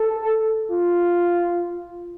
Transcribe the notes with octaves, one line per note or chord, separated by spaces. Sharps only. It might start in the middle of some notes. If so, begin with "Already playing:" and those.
Already playing: A4
F4